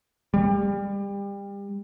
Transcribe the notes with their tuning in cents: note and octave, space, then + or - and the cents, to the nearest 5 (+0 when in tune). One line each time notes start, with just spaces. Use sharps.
G3 +30